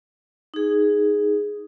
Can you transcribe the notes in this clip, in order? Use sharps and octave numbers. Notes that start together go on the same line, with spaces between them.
D#4 G#4